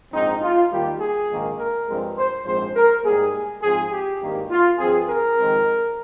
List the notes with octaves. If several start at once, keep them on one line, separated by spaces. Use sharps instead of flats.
A#1 G#2 F3 C4 D#4
F4
D#2 D#3 G3 A#3 G4
G#4
A#1 G#2 D#3 A#3
A#4
G2 F3 G#3 C4
C5
A#1 G#2 F3 G#3 C4 C5
A#4
G#2 G3 A#3 G#4
G#2 F3 C4 G#4
G4
G#1 G2 D#3 A#3
F4
G2 F3 C4 G#4
A#4
F2 D#3 G#3 C4